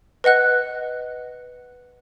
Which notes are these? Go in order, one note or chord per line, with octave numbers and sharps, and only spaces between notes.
B4 D#5 F#5 F#6